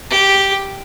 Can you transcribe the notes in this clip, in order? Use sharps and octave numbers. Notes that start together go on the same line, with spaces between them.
G4